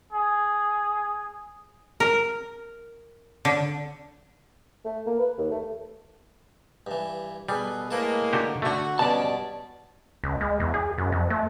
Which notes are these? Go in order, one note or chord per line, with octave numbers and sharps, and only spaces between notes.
G#4
A#4
D3
A3
A#3
B4
D#2
A3
G2 E3
B2 G3 G#4 A4 B4
A2 G#3 A#3 A4 B4
D3 F#4 G4
D3 A3 F#4
G2 B2 B3 C#4 D5 A5
C#2
G#3
E2
G#4
F#2
F2
A3